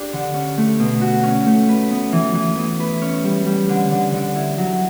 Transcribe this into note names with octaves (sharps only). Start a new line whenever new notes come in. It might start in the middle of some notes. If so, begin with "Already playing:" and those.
Already playing: D4 G4
D3
C#4
A3
B2
F#4
C#4
A3
B4
B3
E3
E3
B3
B4
C#4
G3
G3
D3
D3
D3
E4
F#3